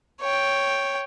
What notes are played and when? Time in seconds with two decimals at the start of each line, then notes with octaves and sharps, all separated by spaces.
0.21 C#5 G5